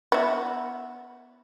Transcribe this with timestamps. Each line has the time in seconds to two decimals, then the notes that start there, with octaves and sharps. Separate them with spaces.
0.12 B3 E4